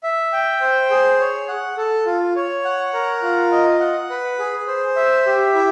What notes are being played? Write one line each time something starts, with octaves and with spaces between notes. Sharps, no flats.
E5
G5
C5
G#4
C#5
F#5
A4
F4
C#5
F#5
A#4
F4
D#5
F#5
B4
G#4
C5
E5
G4
E4